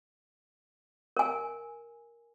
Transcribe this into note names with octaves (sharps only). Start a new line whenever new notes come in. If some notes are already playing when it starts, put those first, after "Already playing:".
A#4 G#5